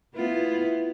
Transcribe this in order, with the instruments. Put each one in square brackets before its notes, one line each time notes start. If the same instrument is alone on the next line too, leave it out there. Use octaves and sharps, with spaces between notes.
[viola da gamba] B3 E4 F4